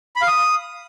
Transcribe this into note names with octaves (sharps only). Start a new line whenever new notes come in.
B5
F5
D#6